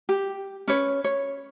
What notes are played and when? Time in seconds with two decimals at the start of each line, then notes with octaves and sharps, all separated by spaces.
0.09 G4
0.68 C#4 B4 C#5
1.04 C#5